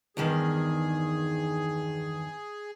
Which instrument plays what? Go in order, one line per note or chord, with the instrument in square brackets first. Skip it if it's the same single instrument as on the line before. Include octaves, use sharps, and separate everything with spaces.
[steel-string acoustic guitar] E2 G2 D#3 [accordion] G#4